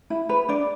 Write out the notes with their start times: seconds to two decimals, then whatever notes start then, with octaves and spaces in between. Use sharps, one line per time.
0.10 E4
0.29 B4
0.49 D4 D5